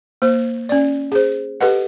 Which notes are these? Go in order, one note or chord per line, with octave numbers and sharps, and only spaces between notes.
A#3 C5
C#4 D5
G#4 C5
G4 A4 B4 D#5 F#5